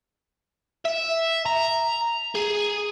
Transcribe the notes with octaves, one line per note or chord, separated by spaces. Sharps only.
E5
A#5
G#4